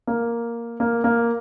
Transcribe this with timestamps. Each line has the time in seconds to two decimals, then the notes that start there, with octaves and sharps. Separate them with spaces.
0.07 A#3
0.80 A#3
1.04 A#3